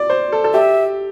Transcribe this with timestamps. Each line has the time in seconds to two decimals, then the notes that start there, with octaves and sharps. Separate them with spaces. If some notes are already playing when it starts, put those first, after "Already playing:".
Already playing: D5
0.10 C5
0.32 A4
0.44 A4
0.53 G4 E5